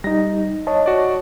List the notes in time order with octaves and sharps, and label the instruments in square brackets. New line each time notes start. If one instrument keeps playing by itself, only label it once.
[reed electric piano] G3 D#4 [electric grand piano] A#6
[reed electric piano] C#5 D#5 A5
[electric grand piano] F#4 D5